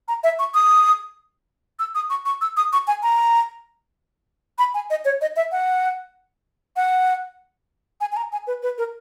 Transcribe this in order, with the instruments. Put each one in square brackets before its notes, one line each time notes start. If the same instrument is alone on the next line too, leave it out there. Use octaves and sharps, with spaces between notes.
[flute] A#5
E5
C#6
D#6
E6
D#6
C#6
C#6
E6
D#6
C#6
G#5
A#5
B5
G#5
D#5
C#5
D#5
E5
F#5
F#5
G#5
G#5
A#5
G#5
B4
B4
A#4